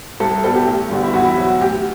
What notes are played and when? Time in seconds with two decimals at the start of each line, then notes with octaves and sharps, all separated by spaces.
0.20 C2 A4
0.44 B2 G3 B3 A4
0.55 G4
0.67 A1
0.90 G2 D3 G3 B3
1.04 E4
1.14 E2 F#4
1.25 E4
1.37 B2 F#3 F#4
1.49 F#4
1.61 D2 G4